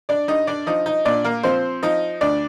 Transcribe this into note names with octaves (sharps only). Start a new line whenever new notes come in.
D4 D5
G2 D#4 D#5
D4 D5
F3 D#4 D#5
D#4 D#5
A#2 D4 D5
A#3 A#4
F3 C4 C5
F3 D#4 D#5
D2 D4 D5